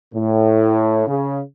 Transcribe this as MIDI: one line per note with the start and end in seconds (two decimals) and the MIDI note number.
0.13 1.04 45
1.07 1.39 49